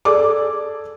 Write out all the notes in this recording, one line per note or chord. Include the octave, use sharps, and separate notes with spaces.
G#4 A4 D5 D6